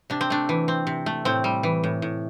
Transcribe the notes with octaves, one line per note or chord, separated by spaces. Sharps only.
C3 D4
C4
A3 D4
E3
C4
C3
A3
A2 C4
G3
E3
A2
A2